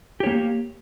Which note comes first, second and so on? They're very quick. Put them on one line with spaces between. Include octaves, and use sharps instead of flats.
G4 C#5 A#3